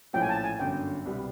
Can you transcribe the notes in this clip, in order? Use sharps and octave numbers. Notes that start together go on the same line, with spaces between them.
A#1 A2 F3 A3 C#4 G5
G#5
A5
G#5
G1 F#2 D3 G5
C2 B2 G3 B3